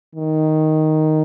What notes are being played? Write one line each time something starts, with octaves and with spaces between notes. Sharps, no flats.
D#3